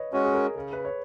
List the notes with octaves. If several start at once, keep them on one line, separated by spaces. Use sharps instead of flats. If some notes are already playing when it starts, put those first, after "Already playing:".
Already playing: B4 C#5 D#5
G#3 C#4 F#4 C#5
G#4
A#4
C#3 G#4
B4
C#5